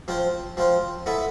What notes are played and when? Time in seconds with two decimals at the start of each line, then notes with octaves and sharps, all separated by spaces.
0.08 F3 C4 F4 C5
0.57 F3 C4 F4 C5
1.06 B3 E4 A4 E5